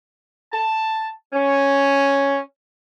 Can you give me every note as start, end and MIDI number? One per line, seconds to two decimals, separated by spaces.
0.53 1.08 81
1.33 2.40 61